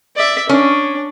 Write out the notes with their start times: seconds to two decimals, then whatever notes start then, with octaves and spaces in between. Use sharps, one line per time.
0.16 D5 E5
0.49 C#4 D4